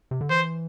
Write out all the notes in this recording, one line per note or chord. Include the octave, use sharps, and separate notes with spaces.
C3
D3
E3 C5